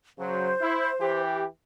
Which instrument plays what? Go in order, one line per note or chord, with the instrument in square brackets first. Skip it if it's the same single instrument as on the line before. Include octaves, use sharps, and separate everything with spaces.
[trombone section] C#3 F#3 [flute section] C5
[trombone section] E4
E3 G4